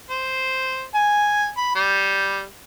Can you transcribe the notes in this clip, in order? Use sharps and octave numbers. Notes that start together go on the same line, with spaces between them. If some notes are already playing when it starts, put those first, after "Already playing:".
C5
G#5
B5
G3